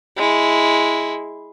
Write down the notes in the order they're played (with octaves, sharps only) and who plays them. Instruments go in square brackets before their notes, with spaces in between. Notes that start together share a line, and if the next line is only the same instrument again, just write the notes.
[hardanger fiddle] G#3 E4